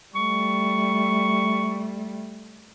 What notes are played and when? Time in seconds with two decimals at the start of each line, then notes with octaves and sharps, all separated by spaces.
0.15 G3 A3 C#6